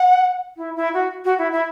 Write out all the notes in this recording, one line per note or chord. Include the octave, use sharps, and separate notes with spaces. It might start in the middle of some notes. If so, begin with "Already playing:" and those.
Already playing: F#5
E4
E4
F#4
F#4
E4
E4